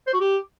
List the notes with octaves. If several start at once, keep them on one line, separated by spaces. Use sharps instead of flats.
C5
F#4
G4